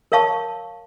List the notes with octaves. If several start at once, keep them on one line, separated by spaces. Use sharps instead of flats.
A#4 C#5 F5 A5 C#6